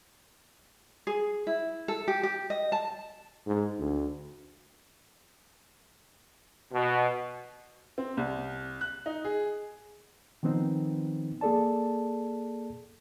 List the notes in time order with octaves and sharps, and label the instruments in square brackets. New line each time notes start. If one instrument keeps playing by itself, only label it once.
[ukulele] G#4
E4
A4
G4
G4
D#5
A5
[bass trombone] G#2
D2
[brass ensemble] B2
[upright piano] C4
C2
F#6
D#4
G#4
[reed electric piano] D#3 F3 B3 C4 D#4
A#3 G#4 A4 D5 A5